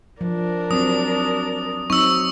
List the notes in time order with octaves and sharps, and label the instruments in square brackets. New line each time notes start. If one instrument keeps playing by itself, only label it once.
[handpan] F3 [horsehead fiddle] D4 A#4
[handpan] F#3 C4 [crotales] D#6
[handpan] F#3 C4 D#4 [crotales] C#6 E6